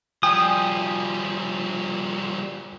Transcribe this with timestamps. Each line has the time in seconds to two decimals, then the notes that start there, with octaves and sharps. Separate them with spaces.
0.23 F3 G3 G5 G#5 D#6